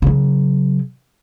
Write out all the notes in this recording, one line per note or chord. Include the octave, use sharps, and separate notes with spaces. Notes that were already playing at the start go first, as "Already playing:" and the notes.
C#3 F#3